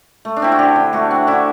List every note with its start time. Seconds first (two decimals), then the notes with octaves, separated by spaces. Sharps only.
0.25 A3
0.36 D4
0.42 C4 E4
0.52 F#4
0.59 D3 G4
0.76 D3
0.93 A3 F#4
1.11 C4
1.27 D3 E4